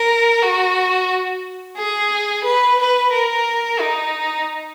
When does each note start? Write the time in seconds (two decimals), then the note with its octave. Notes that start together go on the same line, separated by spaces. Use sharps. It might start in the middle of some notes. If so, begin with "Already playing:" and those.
Already playing: A#4
0.42 F#4
1.77 G#4
2.44 B4
2.79 B4
3.12 A#4
3.80 D#4